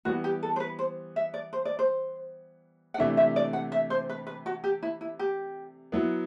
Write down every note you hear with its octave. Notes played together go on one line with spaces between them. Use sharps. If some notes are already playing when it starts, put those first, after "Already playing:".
E3 G3 B3 F#4
G4
A4
C5
B4
C5
E5
D5
C5
D5
C5
F#5
C3 E3 A3 D4 E5
E5
D5
F#5
E5
C5
B4
B4
F#4
G4
E4
E4
G4
F#3 B3 E4